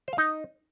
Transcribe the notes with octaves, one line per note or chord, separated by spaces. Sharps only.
C5
F5
D#4